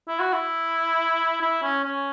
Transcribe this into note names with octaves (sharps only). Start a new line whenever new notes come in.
E4
F#4
E4
E4
C#4
C#4